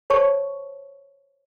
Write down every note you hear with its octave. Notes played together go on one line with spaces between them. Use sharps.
C5 C#5 A5 C#6